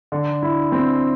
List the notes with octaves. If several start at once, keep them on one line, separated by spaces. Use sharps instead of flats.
D3
E4
C4